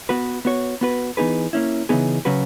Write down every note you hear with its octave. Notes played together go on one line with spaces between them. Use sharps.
B3 F#4 B4
B3 F#4 C#5
B3 F#4 B4
E3 B3 D#4 G#4 B4
A#3 C#4 E4
C#3 E3 B3 D#4 G#4
C#3 F#3 C#4 F#4 B4